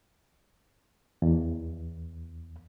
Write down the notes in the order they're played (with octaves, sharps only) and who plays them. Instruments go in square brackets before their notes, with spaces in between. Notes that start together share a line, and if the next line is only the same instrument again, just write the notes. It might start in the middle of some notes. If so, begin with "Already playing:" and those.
[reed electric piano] E2